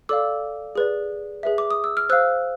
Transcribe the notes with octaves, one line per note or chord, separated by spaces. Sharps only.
A4 D5 F5 D6 E6
G#4 B4 D5
G#4 B4 E5
D6
D#6
E6
F6
C5 F5 E6 F#6